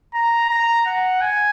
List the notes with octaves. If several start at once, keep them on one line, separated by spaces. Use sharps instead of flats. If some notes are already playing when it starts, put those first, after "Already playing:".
A#5
A#5
F#5
G#5